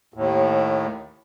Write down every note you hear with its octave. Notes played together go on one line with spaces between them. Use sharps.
D#2 A2